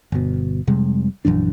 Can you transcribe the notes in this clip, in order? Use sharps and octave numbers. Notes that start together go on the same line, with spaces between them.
G1 B2
F1 C3 G3 G#3
A#1 F#2 E3 D4